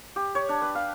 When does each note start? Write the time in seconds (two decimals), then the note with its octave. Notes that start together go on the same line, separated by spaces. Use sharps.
0.16 G4
0.35 C#5
0.49 D4
0.62 B4
0.75 F5